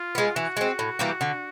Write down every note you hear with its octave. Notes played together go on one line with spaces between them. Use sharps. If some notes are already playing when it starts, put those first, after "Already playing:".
Already playing: F4
G#3 B3
E3 F#4
G#3 C4
A2
E3 G3 A#3
D3